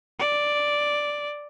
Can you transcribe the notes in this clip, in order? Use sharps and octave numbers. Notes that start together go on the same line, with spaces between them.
D5